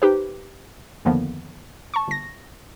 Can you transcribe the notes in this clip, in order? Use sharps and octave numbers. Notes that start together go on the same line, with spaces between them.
D#4 G4 B4 C5
F2 D3 D#3 F3 A#3 B3
A5 C#6
G1 A#6